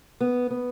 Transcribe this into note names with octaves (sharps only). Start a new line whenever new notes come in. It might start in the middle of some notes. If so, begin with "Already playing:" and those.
B3
B3